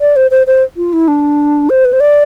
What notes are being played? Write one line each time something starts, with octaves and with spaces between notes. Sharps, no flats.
D5
C5
C5
C5
F4
E4
D4
C5
B4
C5
D5